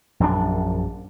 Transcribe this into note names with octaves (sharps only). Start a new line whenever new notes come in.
A#1 F#2 C#3 D4